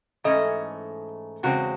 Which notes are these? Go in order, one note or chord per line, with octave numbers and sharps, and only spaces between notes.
G#2 E3 A3 C#4 D#5
E2 C#3 G#3 C4 F#4